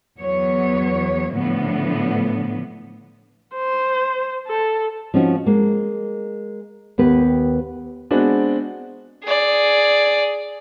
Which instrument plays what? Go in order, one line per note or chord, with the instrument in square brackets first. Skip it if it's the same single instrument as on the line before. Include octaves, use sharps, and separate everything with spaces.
[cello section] E2 F#3 B3 C#5
A2 D3 F3 B3
[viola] C5
A4
[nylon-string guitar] F3 C4 C#4 D#4 F4 F#4
G#3 A#3
D#2 B3 G4 B4
[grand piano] G#3 B3 C4 D4 F#4
[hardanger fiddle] G#4 D5